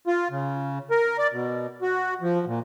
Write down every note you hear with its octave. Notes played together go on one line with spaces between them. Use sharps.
F4
C#3
A#4
D5
B2
F#4
F3
A#2